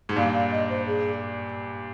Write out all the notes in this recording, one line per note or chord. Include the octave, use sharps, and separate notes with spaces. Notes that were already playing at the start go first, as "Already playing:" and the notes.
G#2
G2 A#2 F5
F5
D#5
C5
G#4